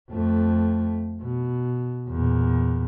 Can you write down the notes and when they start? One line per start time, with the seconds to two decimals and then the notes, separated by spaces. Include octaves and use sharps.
0.11 F2 A3
1.21 B2
2.10 E2 A#2